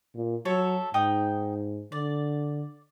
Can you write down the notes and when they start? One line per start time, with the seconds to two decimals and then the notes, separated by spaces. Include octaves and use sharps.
0.15 A#2
0.45 F#3 A4 C#5 E5
0.94 G#2 D#4 G5 D#6
1.92 D3 D5